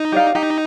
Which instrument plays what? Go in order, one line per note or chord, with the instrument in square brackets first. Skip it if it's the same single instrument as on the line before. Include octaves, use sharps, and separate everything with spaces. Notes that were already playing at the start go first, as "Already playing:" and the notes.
Already playing: [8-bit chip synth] D#4
[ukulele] G4 D5 F5
[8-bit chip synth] D#4 [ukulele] G4